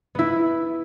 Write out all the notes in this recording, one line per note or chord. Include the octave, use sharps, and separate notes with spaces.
B3 E4